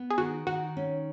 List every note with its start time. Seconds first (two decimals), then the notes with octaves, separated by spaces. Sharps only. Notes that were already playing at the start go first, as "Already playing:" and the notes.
Already playing: B3
0.10 G#4
0.18 D#3 F#4
0.47 D#3 F#4
0.77 C#4